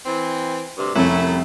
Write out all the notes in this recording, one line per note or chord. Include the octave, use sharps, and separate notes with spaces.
E3 C4
D2 G2 C3
C2 F2 A3 C#4 E4